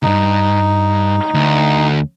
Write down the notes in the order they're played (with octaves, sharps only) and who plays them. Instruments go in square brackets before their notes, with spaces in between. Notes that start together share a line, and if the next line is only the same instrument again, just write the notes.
[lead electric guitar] C#2 G2 [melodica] D#4
[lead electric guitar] D2